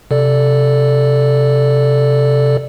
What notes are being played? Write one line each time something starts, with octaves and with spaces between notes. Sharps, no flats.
C3 A4 D5